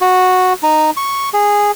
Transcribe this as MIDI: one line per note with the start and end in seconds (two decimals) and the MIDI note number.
0.01 0.53 66
0.63 0.90 63
0.97 1.29 85
1.33 1.71 68